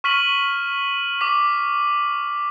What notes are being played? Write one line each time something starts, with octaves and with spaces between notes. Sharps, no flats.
C#6 F6 B6 D#7 F#7
D6 B6